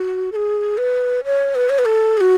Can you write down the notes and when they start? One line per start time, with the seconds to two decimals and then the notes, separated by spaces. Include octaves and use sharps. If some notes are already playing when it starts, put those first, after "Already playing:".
Already playing: F#4
0.32 A4
0.36 G#4
0.78 B4
1.24 C#5
1.55 B4
1.70 C#5
1.79 B4
1.85 A4
2.17 G#4
2.21 F#4